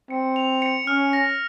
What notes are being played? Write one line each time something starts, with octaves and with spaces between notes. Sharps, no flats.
C4 C#7
F7
C#7
C#4 F6
A#6